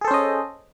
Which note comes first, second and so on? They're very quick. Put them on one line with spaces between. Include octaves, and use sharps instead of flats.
G#4 A4 C5 C#4 D#5